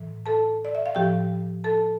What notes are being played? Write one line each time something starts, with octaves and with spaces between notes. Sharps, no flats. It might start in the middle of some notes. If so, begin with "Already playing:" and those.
Already playing: A2 E3
A4 A5
D5
E5
F5
A2 F3 G4 G5
A4 A5